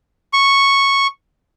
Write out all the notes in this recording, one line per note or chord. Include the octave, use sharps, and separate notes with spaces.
C#6